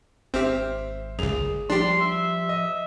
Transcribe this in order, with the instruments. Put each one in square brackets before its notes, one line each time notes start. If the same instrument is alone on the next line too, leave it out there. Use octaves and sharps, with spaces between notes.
[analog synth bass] G#1 [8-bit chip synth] C4 G4 [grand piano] C5 E5 F6
[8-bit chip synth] C#2 F#2 [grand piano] G#4 F7
[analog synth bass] F3 [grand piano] G3 [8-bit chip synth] D4 G4 [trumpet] C6
[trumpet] E5
[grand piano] D#5